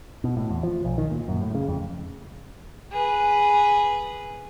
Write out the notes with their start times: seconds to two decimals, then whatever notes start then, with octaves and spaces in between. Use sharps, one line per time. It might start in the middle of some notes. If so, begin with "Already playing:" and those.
0.24 B2
0.37 A2
0.51 E2
0.63 F3
0.85 B1
0.98 D#3
1.11 A#2
1.28 F#2
1.42 A2
1.55 C#3
1.68 F2
2.92 G#4 B4